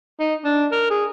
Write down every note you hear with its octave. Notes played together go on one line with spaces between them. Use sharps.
D#4
D4
A#4
G#4